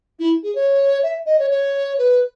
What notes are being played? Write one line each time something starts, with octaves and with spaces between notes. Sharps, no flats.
E4
G#4
C#5
E5
D#5
C#5
C#5
B4